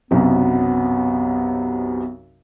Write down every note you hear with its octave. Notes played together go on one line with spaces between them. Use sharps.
B1 F#2 C3 B3